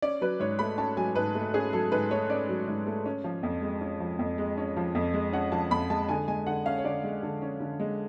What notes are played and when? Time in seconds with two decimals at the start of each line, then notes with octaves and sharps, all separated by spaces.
0.02 C#4 D5
0.21 F#3 B4
0.40 G#2 C#5
0.59 A3 B5
0.78 C#4 A5
0.97 F#3 G#5
1.15 G#2 B4
1.35 A3
1.54 C#4 G#4
1.73 F#3 A4
1.92 G#2 B4
2.11 A3 C#5
2.29 C#4 D5
2.49 F#3
2.68 G#2
2.87 A3
3.06 C#4
3.24 F3
3.43 F2
3.62 G#3
3.81 C#4
4.00 F3
4.19 F2
4.38 G#3
4.57 C#4
4.77 F3
4.95 F2
5.14 G#3
5.33 C#4 F#5
5.52 F3 A5
5.71 F2 B5
5.90 G#3 A5
6.09 D3 G#5
6.28 G#3 G#5
6.47 D3 F#5
6.66 C#4 F5
6.78 C#5
6.84 D3 D5
7.04 G#3
7.23 D3
7.42 C#4
7.61 D3
7.80 G#3